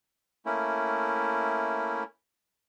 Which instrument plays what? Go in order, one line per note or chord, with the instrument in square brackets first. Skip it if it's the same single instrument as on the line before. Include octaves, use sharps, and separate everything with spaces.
[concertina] A3 A#3 C#4 E4